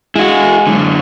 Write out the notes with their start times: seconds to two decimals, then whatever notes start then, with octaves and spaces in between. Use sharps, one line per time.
0.16 G#3 E4 F#4 G#4
0.67 F#2 D3